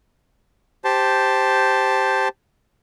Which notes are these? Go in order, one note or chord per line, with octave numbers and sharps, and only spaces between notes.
G4 C5 A5